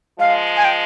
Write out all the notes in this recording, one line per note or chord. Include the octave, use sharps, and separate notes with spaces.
F3 G#3 F5
G#5
G5